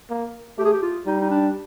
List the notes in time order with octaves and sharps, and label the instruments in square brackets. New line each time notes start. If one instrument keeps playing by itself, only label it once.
[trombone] A#3
[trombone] A3 [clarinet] G4
[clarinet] G#4
G4
F4
[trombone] G3 [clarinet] D#4
[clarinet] D#4
D4